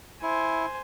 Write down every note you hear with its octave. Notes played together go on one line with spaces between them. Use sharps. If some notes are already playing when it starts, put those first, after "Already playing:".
E4 C5 G#5